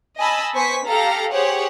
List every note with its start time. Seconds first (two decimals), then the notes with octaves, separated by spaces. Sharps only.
0.18 D#5 G#5 A5 B5 E6
0.54 B3 C5 G#5 C#6 B6
0.85 G4 A4 F5 A#5
1.30 G4 G#4 C5 C#5 F#5